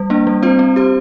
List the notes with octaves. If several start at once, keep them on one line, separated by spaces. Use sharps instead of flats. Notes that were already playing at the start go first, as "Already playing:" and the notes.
Already playing: G3
A#3 D4
G3
C4 F4 C5
C4
G4 C5